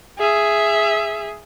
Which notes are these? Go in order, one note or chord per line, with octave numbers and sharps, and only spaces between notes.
G#4 E5